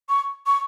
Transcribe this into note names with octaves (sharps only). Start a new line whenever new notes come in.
C#6
C#6